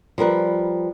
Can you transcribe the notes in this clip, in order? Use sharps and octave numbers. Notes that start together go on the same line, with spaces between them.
F3 G3 A#4 B4